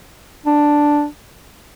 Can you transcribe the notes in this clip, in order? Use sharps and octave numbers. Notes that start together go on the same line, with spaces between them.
D4